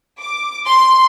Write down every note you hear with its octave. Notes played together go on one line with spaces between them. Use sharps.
D6
C6